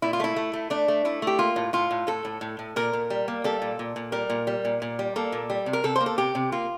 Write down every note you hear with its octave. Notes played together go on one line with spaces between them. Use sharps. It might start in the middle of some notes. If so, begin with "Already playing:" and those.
A#2 E4
F4
A3 E4
A3
A3
A3 D4
A3
A3 E4
A3 G4
A#3 F4
A2
A2 F4
A2
A2 A4
A2
A2
A2
A#2 A#4
A#2
G3
A#3
G3 A4
A#2
A#2
A#2
G3 A#4
A#2
G3
A#2
A#2
G3
A#3 A4
A#2
G3
C3
A#4
C3 A4
C5
A#3
A4
C3 G4
C3
A#3 F4